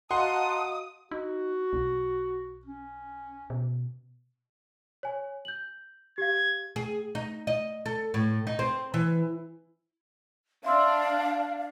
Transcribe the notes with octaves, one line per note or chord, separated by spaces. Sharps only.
F#4 D#5 F5 F#5 A5 A#5 C6 D#6
D#4 F#4
B1
C#4
B2
C#5 G#5
G6 F#7
G4 F5 G#6
G#4
D#4
D#5
A4
A2
D#4
C4
E3
D4 E5 F5 C6 E6